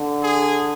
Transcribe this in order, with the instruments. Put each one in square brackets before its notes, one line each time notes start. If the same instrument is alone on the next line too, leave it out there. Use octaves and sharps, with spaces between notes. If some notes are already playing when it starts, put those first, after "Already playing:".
Already playing: [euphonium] D3
[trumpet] G#4